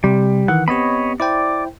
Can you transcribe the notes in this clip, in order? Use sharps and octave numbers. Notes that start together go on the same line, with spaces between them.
C3 G3
D#3 E3 F#5
B3 C4 G4 C#5 D#5 B5
E4 C5 D5 G5